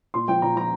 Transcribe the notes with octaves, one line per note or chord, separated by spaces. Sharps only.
A#2 C6
F3 G5
A#2 A#5
F3 A#5